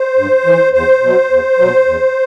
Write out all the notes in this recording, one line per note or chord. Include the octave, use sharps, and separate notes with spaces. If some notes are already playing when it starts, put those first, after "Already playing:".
Already playing: C5
G2
E3
E2 C5
B2 F#3
E2
B2 F#3
E2